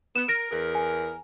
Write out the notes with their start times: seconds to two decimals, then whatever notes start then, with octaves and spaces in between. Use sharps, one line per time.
0.16 B3 E7
0.28 A#4 A#6 D7
0.51 E2 G#4 A#4
0.75 G#5